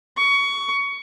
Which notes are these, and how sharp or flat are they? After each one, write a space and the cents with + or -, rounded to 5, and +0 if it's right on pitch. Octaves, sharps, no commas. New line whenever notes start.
C#6 +20